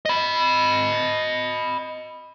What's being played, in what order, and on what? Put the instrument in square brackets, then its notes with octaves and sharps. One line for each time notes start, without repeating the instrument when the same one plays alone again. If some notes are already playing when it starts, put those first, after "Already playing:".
[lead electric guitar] D#5 B5